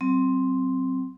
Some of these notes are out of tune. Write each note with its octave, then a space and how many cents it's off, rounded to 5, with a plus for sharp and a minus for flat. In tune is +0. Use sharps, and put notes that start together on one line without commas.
F#3 +35 C4 +0